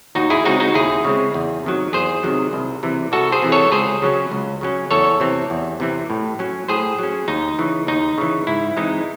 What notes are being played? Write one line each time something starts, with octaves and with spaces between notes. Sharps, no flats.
D#2 D#4 F#4
E4 G#4
C#3 G#3 C4 D#4 F#4
D#4 F#4
D#2 E4 G#4
C#3 G#3 C4
E2
C3 D#3 F#3
E2 G#4 C5
C3 D#3 F#3
C2
C3 E3
C2 F#4 A4
G#4 C5
C3 E3
A4 C#5
C#2 G#4 C5
C#3 F#3 C#4
C#2
C#3 F#3 C#4
E2 A4 C#5
C3 E3 C4
E2
C3 E3 C4
A2
F#3 C#4
A2 G#4 C5
F#3 C#4
D#2 D#4
C#3 E3
D#2 D#4
C#3 E3
G#2 E4
E3 G#3 C4 D#4